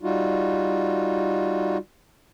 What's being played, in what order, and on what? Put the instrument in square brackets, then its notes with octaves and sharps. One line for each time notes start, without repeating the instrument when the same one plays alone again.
[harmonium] G3 D#4 F4 F#4